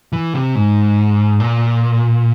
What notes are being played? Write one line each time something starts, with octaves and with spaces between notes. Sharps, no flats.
E3
C3
G#2
A#2